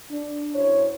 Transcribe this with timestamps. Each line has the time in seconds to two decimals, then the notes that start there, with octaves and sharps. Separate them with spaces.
0.11 D4
0.55 F#2 E4 C5 C#5